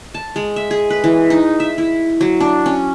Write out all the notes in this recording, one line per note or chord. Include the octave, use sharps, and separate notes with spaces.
A5
G#3
E5
G#4
B4
E3
D#4
E5
E4
F#3
D4
C#4